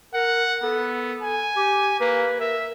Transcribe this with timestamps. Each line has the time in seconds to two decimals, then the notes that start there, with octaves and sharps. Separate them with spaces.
0.14 A#4 F#5
0.63 B3 A4
1.22 G#5
1.56 G4
2.00 A#3 B4
2.40 A#4 E5